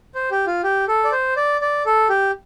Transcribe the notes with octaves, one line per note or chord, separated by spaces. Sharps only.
C5
G4
F4
G4
A4
D5
C5
D5
D5
A4
G4